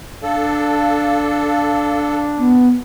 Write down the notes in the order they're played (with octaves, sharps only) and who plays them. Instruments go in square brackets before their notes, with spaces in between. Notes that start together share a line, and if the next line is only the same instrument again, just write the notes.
[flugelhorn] D4 [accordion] A4 [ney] F5
[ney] B3